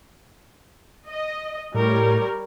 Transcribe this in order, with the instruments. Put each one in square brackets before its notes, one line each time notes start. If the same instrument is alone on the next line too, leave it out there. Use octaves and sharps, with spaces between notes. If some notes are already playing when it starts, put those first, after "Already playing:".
[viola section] D#5
[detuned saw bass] A2 [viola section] G3 A#4 C#5